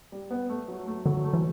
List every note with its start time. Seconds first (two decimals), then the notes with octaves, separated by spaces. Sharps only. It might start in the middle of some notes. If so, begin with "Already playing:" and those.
0.12 G3
0.31 B3
0.50 A3
0.68 F#3
0.88 A3
1.05 D3 F#3
1.25 A3
1.33 E3